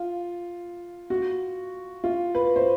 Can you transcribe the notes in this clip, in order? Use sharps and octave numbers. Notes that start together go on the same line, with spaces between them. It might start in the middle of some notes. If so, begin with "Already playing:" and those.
Already playing: F4
F#4
F4
B4
C5